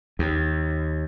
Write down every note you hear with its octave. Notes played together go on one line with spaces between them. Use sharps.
D#2